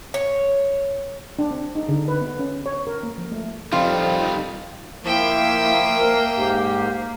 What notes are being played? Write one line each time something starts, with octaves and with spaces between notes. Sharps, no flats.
C#5
D4
C4
D#4
D3
B4
B3
C#4
C#5
A#4
A#3
F3
A3
F2 D#3 G3 F4
F3 A#3 E4 E5 G5
A#4
G#2 G4